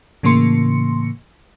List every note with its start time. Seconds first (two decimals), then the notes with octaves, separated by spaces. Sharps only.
0.23 A2 C#3 E3 A#3 C6 C#7